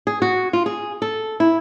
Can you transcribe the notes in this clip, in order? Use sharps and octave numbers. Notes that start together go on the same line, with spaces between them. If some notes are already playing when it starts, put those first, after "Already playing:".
G#4
F#4
F4
G#4
A4
E4